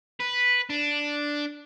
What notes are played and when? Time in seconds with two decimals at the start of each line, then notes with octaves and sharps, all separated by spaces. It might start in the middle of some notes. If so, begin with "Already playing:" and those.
0.20 B4
0.70 D4